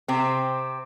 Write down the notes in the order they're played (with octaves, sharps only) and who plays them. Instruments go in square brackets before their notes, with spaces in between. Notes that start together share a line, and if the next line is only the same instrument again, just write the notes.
[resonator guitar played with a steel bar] C3 C4